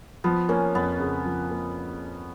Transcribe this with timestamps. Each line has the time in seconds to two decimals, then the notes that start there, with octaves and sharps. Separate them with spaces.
0.24 F3 B3
0.49 A#3 C#4
0.75 F2 B3
1.00 C#3
1.26 F3
1.51 A#3